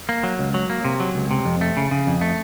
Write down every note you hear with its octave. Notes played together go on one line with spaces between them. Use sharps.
A#3
F#3
C#2
F#3
A#3
C3
F#3
C#2
C3
F2
A3
C#3
C#3
F2
A3